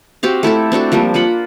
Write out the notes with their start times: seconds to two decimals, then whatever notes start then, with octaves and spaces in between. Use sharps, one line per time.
0.23 C4 F#4 G4 F5
0.43 A3 E4 G4 A4
0.72 C4 D4 F#4 A4
0.92 F3 G3 A#3 D4
1.14 A#3 F4 F#5 B5